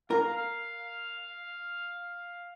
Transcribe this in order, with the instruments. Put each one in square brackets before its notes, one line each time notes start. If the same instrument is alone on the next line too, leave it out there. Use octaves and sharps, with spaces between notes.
[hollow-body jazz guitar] A#4 [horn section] F5